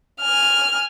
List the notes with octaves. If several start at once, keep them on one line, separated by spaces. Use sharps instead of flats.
G#5 F6